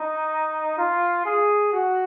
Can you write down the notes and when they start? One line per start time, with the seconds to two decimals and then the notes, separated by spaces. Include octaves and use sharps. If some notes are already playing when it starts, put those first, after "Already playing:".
Already playing: D#4
0.78 F4
1.26 G#4
1.73 F#4